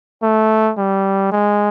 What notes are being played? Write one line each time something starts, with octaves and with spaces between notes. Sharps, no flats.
A3
G3
G#3